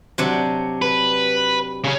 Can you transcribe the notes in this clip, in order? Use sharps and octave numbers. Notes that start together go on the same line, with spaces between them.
C3 F#3 D4
B4
C#3 C#4